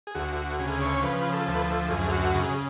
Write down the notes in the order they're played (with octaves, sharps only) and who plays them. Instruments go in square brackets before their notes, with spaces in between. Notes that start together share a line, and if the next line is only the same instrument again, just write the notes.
[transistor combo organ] G#4
D2 F#4
F#4
C#3 G#4
C#5
F3 B4
A4
D2
B4
A4
F#2 G#4
F#4
C#3 G#4